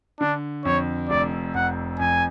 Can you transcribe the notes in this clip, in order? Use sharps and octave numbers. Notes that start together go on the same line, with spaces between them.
D3 D4
F2 C#5
F1 D5
F2 F#5
F2 G#5